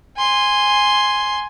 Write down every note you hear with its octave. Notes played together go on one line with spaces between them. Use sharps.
G#5 C6